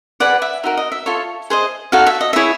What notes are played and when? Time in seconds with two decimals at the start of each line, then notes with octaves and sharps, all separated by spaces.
0.20 G#4 B4 D5 F#5
0.42 E5
0.63 D#4 F#4 A#4 E5
0.77 D#5
0.92 E5
1.06 F4 A4 C#5
1.50 G#4 C5 D#5
1.92 D#4 F#4 A4 C#5 F5
2.07 E5
2.21 D#5
2.33 E4 G#4 C#5 E5